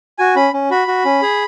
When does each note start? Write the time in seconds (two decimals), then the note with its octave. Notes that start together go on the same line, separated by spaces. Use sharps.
0.18 F#4 G#5
0.36 C#4 B5
0.53 C#4
0.70 F#4 B5
0.88 F#4
1.05 C#4
1.22 G#4